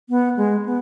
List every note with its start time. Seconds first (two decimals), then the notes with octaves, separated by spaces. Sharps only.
0.10 B3
0.37 G#3
0.65 B3